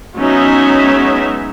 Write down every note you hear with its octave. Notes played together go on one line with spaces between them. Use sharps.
F#3 G#3 B3 C#4 D#4 E5